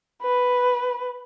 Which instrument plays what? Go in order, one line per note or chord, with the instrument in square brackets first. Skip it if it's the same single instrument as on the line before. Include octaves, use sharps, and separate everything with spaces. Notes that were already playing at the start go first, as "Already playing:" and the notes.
[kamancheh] B4